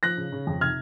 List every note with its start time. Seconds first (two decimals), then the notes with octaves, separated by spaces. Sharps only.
0.03 F3 F#6 A#6
0.17 C#3
0.32 C#3
0.47 F2
0.61 C3 F6 G#6